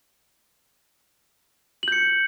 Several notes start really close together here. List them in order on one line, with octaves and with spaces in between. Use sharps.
F#7 G6 C#7